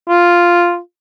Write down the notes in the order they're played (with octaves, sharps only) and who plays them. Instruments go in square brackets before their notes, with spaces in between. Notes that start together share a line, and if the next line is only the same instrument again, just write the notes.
[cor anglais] F4